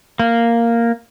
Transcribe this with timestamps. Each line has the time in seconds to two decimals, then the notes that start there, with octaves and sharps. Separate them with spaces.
0.20 A#3